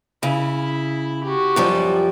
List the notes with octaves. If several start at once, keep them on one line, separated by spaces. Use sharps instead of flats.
C#3 E4 B5
F#4 G4
F#2 F3 G3